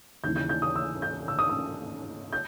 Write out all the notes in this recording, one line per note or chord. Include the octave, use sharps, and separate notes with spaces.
D#2 C#3 E3 G6
G6
G6
D#6
E6
G6
E6
D#6
E6
G6